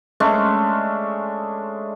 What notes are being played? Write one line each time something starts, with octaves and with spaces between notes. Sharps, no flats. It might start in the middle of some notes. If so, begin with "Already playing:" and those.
G#3 A3 C#4 D4